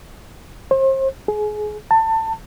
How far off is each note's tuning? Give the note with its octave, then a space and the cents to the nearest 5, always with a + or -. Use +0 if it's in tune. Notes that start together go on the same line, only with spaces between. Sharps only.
C5 +35
G#4 +25
A5 +25